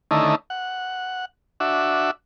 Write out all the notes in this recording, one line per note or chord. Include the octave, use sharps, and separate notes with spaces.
D3 D#3 A3 C#4 D#4 E4
F#5
D4 F#4 E5